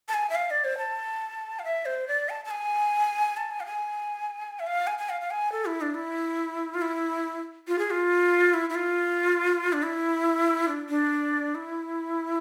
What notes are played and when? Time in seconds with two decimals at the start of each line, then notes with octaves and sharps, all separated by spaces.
0.09 A5
0.14 G#5
0.30 E5
0.35 F5
0.50 D5
0.64 C5
0.78 A5
1.59 F5
1.64 E5
1.86 C5
2.08 D5
2.29 A5
2.45 A5
2.51 G#5
3.37 A5
3.51 G#5
3.60 F5
3.66 G#5
4.60 E5
4.66 F5
4.87 G#5
4.98 G#5
5.10 F5
5.21 F5
5.31 G#5
5.52 A4
5.66 E4
5.81 D4
5.94 E4
6.74 F4
6.82 E4
7.68 F4
7.79 G#4
7.91 F4
8.54 E4
8.70 E4
8.75 F4
9.73 D4
9.83 E4
10.68 D4
10.89 D4
11.55 E4